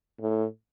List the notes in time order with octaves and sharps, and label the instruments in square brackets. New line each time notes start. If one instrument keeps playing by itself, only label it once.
[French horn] A2